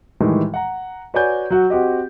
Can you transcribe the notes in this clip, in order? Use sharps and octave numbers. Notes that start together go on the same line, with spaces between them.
A2 D#3 E3 G3 G#3
F#5 A#5
F#4 B4 C#5 D5 G#5 G6
F#3 F#4
C4 F#4 G4 D#5